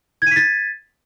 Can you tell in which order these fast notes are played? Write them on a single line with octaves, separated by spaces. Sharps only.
G#6 D#7 B6 A6